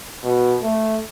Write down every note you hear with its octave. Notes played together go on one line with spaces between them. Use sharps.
B2
A3